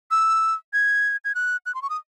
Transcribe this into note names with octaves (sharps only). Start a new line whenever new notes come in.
E6
G#6
G#6
F#6
F#6
C6
C#6
D#6